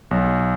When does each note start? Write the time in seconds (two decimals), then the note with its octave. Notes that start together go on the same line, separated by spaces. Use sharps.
0.11 B1